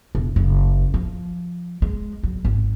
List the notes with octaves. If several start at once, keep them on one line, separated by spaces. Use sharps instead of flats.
E1
F#1
F3
G#3
F#3
G#1